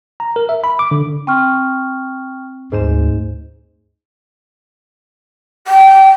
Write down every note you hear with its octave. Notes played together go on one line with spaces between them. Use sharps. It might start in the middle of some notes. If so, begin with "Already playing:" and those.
A#5
A#4
E5
B5
D6
D3
C4 G5 C#6 F6
D2 G#2 C5 E7
G5